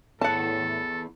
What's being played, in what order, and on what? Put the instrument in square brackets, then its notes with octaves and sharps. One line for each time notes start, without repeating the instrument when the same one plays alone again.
[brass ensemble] A2 [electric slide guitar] B3 E4 G#4 [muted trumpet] A4 [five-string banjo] F#5 A5